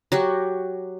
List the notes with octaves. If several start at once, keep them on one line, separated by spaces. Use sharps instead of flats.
F#3 F#4 G4